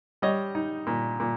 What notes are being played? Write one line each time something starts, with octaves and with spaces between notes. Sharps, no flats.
G3 C#5 D#5
D#4
A#2
A#2